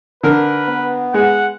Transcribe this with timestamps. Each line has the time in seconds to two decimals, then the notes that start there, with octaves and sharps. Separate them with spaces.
0.23 D3 A#4 B4
0.69 B3
1.14 G#3 F#5